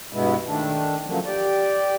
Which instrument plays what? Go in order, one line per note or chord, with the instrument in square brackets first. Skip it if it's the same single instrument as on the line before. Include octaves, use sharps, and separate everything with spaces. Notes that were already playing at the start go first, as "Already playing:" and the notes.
[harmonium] G2 B2 G#3 B3 E4
D#3 A3 D4
C#3 F3 F#3 A3 A#3
G4 D5